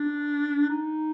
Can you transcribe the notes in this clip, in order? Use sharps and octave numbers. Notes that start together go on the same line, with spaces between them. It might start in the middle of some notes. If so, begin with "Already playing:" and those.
Already playing: D4
D#4